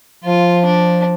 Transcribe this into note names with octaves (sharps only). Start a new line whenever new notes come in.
F3 F4
D4